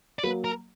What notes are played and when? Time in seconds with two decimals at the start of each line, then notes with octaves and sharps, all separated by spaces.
0.19 D5
0.23 F#3 A#3 B4
0.44 A#4